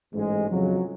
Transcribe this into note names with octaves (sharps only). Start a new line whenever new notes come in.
A1 G#2 G#3
F2 C#3 F#3